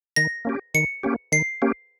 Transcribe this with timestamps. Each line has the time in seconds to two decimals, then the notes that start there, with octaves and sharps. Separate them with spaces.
0.16 D#3 A#6
0.45 A#3 C#4 G4
0.74 D#3 C#7
1.03 A#3 C#4 G4
1.32 D#3 C7
1.62 A#3 C#4 G4